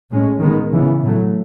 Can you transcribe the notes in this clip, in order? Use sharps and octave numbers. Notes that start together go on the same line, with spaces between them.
A2 G#3 C#4
D#3 G#3 B3
C#3 E3 B3
A2 F#3 A3